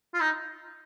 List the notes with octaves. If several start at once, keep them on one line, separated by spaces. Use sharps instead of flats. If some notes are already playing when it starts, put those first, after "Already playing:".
F4
D#4